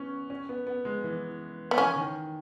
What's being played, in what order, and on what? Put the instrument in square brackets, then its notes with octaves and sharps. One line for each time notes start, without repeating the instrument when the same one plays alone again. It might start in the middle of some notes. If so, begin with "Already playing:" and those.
Already playing: [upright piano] B3 C#4
C#4
B3
B3
G#3
E3
[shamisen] B3
[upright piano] E3 [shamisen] C#4
[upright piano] D#3